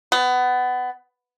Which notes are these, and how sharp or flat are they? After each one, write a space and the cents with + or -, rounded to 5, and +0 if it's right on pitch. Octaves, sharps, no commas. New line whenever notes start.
B3 +20